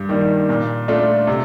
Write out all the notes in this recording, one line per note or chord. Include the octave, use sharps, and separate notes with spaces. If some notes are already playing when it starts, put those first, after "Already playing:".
Already playing: G2
D#3 G3 A#3
A#2
A3 D4 F4
C3